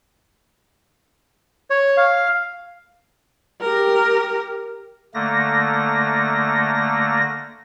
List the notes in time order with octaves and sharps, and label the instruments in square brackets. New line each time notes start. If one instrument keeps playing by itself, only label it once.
[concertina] C#5
F5
[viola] G4 A#4
[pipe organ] D3 A3 A#3 A#6